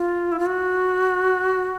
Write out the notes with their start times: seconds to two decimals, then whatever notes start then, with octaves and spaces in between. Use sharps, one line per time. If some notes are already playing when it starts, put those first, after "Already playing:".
Already playing: F4
0.32 E4
0.39 F4
0.46 F#4